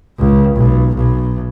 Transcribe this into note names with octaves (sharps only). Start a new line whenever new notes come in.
C#2
B1
B1